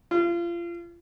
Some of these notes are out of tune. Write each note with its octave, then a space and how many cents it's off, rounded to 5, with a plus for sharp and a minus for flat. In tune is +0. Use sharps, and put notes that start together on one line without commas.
F4 -30